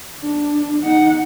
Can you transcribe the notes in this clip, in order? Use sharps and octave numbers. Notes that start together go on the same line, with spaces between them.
D4
D#4 F#5